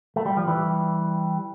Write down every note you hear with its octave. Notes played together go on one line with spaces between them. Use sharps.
A3
G3
F3
E3 G3